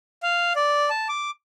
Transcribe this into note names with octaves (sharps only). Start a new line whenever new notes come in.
F5
D5
A5
D6